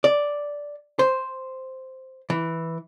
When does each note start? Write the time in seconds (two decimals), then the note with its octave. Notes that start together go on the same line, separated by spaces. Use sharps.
0.04 D5
0.99 C5
2.30 E3